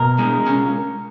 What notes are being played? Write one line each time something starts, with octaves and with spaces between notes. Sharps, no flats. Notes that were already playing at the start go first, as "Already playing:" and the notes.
Already playing: B2 A#4
G#3
C#4